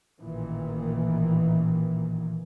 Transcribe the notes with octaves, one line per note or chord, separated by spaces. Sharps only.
A1 A#2 D#3 E3